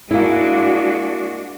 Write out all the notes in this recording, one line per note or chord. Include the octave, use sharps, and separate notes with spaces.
G#3 A#3 D4 E4 F#4